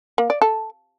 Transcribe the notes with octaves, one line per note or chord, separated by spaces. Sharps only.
A#3
D5
A4